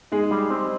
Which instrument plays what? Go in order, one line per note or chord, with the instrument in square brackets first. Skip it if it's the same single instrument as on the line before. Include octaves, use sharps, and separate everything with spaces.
[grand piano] G#3 G#4 [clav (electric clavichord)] D#4
[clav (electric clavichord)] G3
C4